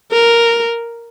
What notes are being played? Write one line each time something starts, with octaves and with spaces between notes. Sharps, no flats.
A#4